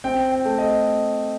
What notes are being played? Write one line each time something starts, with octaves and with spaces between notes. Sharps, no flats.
C4 G5
G5
A3
D#5